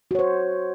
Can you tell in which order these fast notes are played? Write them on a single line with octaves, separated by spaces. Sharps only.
F#4 C#5 C5